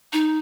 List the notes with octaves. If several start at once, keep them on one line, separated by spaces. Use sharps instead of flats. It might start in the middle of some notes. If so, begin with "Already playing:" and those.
D#4